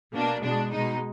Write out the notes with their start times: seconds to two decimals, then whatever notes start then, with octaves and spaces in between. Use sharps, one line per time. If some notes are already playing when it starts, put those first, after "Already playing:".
0.13 B2 A#3 D4
0.42 B2 G#3 D4
0.71 B2 G#3 D#4